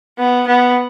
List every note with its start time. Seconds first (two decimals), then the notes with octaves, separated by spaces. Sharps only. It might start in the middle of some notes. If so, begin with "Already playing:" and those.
0.18 B3
0.47 B3